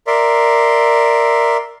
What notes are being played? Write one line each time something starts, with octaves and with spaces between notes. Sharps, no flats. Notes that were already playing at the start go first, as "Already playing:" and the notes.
A#4 D5 E5 C6